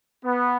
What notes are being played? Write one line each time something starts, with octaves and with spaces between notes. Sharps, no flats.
B3